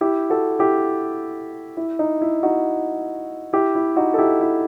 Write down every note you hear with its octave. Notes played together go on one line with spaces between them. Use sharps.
E4 G4
F#4 A4
E4 G4
E4
D#4
E4
D#4 F#4
E4 G4
E4
D#4 F#4
A4
E4 G4
E4